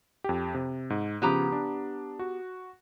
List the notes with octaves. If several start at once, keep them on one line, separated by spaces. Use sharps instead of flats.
F2 G4
C3
G#2
C#3 F3 B3 C#4 G4 A#5
D4
F#4